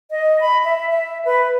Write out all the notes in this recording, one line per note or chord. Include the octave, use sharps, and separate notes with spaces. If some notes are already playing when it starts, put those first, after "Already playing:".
D#5
B5
E5
E5
B4